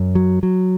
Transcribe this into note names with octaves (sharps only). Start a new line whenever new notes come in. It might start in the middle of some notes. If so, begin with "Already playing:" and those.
Already playing: F#2
F#3
F#3